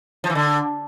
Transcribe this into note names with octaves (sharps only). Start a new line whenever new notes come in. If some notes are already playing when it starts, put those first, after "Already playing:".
F3
E3
D3